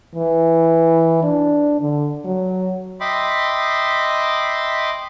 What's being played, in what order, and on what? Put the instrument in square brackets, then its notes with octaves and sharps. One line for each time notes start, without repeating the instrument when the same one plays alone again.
[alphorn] E3
D4
D3
F#3
[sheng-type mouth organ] D#5 E5 G5 B5 C6 D6